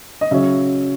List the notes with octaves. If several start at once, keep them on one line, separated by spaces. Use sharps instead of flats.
D#5
C#3 F#3 C#4 E5